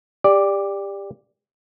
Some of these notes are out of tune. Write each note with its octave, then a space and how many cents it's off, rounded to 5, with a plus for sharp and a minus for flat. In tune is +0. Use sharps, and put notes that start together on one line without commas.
G4 +25 D5 +0